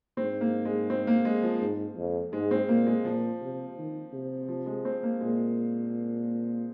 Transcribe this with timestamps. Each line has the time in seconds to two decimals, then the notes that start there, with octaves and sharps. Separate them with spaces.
0.17 G#2 C4
0.41 A#3
0.65 G#3
0.90 C4
1.07 A#3
1.25 G#3
1.43 F3
1.61 G#2
1.97 F2
2.33 G#2 G#3
2.51 C4
2.68 A#2 A#3
2.87 G#3
3.05 A#2 F3
3.42 C3
3.77 D#3
4.13 C3
4.48 F3
4.66 G#3
4.85 C4
5.03 A#3
5.21 A#2 G#3